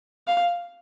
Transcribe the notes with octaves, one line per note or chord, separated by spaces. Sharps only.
F5